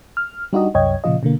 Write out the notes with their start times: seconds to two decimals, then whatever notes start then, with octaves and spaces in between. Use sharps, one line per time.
0.17 F6
0.53 G3 D4 D#4 F#4 G4 D#5
0.74 C2 F#2 C#5 D#5 G5 G#6
1.04 A#2 C#3 F3 F4 D#5
1.23 B2 D3 A#3